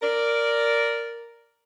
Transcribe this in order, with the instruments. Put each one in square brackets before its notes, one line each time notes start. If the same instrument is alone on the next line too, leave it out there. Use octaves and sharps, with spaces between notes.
[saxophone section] A#4 D5